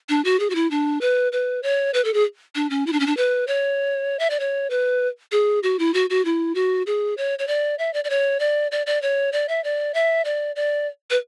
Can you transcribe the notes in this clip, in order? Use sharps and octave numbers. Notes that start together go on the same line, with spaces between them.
D4
F#4
G#4
F#4
E4
D4
B4
B4
C#5
B4
A4
G#4
D4
C#4
E4
D4
C#4
D4
B4
C#5
E5
D5
C#5
B4
G#4
F#4
E4
F#4
F#4
E4
F#4
G#4
C#5
C#5
D5
E5
D5
D5
C#5
D5
D5
D5
C#5
D5
E5
D5
E5
D5
D5
B4